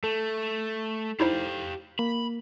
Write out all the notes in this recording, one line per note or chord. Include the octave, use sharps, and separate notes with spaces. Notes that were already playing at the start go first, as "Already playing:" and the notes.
A3 A4
D#4 E4 G4 C5 F5
A#3 B5